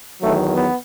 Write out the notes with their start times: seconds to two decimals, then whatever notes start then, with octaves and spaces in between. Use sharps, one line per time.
0.22 E2 D#3 F#3 A3
0.54 B3